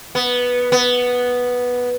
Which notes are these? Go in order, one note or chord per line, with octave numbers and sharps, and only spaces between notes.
B3
B3